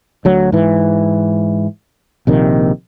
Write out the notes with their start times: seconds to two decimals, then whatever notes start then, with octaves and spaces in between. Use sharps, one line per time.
0.25 D2 F#3
0.52 G#2 E3
2.27 A#1 C3 D#3